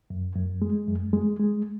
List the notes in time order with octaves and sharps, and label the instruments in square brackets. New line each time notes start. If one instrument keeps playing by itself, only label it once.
[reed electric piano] F#2
F#2
G#3
F#2
G#3
G#3